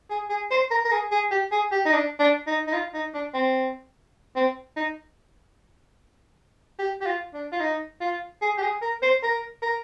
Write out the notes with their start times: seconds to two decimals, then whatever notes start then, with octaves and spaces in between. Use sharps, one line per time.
0.10 G#4
0.29 G#4
0.51 C5
0.70 A#4
0.85 A#4
0.91 G#4
1.12 G#4
1.31 G4
1.52 G#4
1.72 G4
1.85 D#4
1.93 D4
2.19 D4
2.47 D#4
2.67 D#4
2.73 F4
2.94 D#4
3.14 D4
3.34 C4
4.36 C4
4.76 D#4
6.79 G4
7.01 G4
7.06 F4
7.34 D4
7.52 F4
7.60 D#4
8.00 F4
8.42 G#4
8.57 G4
8.62 G#4
8.82 A#4
9.02 C5
9.23 A#4
9.62 A#4